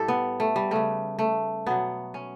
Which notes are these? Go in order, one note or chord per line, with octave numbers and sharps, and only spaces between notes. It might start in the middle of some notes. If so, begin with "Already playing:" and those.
Already playing: A2 G3 G4 A4
B3
A3
G3
C#3 G3 A3
A3
B2 F#3 B3
C#4